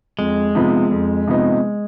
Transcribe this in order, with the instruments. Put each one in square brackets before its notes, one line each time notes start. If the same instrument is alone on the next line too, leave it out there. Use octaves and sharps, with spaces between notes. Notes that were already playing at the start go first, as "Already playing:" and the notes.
[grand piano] F2 [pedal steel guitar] G#3
[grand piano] C3 F3 B3 D#4
F2
C3 F3 B3 D#4